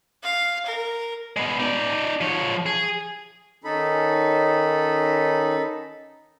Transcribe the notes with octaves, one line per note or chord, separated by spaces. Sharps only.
F5
A#4
G#3 B3
D#4 D5
F3 C#5
G#4
D#3 C#4 D#4 A4 B5